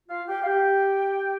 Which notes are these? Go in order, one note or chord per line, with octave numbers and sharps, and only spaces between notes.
F4 F5
G4 G5
F5
G4 G5